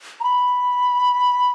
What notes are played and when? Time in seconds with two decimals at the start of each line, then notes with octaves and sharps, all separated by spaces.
0.21 A#5
0.24 B5